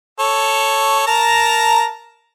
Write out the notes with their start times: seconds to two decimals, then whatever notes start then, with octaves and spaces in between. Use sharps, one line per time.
0.19 A4 C#5
1.07 A#4 A5 A#5